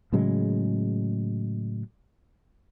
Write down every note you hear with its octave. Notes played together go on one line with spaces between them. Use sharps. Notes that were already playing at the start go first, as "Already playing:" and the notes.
A2 C#3 F#3 G#3